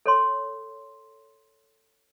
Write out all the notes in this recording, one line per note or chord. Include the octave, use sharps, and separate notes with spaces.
A4 C#5 C6